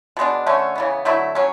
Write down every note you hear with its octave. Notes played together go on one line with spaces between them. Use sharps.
B2 G#3 B3 D4
D3 A3 C#4
C#3 E3 B3
D3 F#3 A3 E4
F#3 C#4